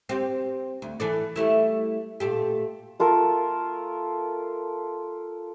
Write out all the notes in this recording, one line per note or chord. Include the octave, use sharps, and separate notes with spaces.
C4 G4
D2
E3 A4 D5
G3 A3 E4
A#2 A3 G4
A3 F4 A4 A#4